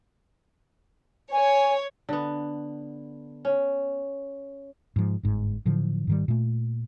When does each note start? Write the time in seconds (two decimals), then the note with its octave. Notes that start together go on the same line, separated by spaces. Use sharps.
1.32 C#5 G#5
2.09 D3 B3
3.45 C#4
4.96 G#2 F3
5.23 G1 G#2
5.65 A2 D3 F3 F#3
6.07 G#2 D#3 G3
6.28 A#2 A3